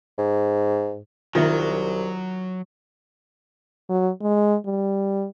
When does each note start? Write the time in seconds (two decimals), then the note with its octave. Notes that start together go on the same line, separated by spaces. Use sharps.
0.18 G#2
1.35 C2 D#3 F#3 F4 E5
3.89 F#3
4.22 G#3
4.66 G3